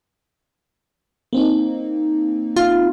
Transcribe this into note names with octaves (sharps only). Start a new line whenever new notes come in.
A#3 C4 D#4
F4